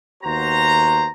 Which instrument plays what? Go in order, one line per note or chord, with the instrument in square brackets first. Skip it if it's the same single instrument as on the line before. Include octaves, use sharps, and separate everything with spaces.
[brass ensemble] D#2 B3 F#4 C5 A#5